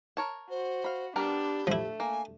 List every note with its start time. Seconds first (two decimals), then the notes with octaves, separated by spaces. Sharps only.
0.17 A#4 C#5 A5
0.50 F#4 C5
0.84 F5 B5
1.16 G3 B3 D4 G4 A#4
1.67 F3 A3 E4
2.00 A#3 G#5